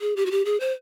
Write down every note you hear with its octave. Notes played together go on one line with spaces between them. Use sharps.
G#4
G4
F#4
G4
G#4
C5